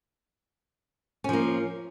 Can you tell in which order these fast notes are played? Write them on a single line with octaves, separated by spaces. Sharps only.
C#4 F3 A#3